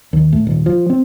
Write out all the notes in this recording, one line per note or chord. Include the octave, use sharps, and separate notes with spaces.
D#2
A2
D#1
F3
C4